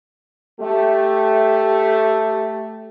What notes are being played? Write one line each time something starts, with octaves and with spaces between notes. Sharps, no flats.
A3 G4